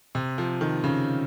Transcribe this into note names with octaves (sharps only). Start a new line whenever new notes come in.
C3
F3
D#3
C#3